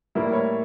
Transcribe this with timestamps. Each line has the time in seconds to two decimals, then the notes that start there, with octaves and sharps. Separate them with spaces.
0.15 A2 G3 A#3 E4
0.33 C#5